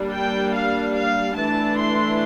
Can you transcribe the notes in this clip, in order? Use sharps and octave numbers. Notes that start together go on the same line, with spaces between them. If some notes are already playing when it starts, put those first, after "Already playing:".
Already playing: G3 A#3 D4
G5
F5
F5
E3 A3 D4 A5
C6